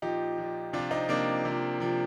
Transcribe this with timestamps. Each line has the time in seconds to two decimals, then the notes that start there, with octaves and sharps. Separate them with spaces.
0.02 A#2 F3 D#4 G4
0.38 A#2 F3
0.73 C3 F3 D4 F4
0.91 C4 D#4
1.08 C3 F3 A#3 D4
1.45 C3 F3
1.80 C3 F3